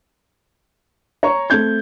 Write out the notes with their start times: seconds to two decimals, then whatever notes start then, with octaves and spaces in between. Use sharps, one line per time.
1.23 C#5 A#5 C#6
1.50 A3 C4 G6 G#6